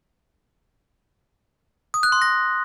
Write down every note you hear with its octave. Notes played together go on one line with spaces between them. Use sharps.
D#6
F#6
C6
A#6